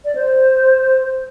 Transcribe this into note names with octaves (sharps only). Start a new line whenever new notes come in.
D5
C5